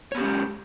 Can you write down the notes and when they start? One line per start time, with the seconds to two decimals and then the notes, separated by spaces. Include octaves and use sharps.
0.12 C#5
0.15 B3
0.18 G4
0.20 C#4
0.23 G#3